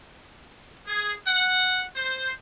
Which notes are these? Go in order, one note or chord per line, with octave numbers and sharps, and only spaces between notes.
G#4
F#5
C5